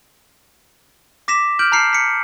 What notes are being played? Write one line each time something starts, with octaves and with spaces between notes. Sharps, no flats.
D6 A#6 B6 E7
F6 G6 D7 F#7
A5 A#5 F6 C7 C#7
B6 C#7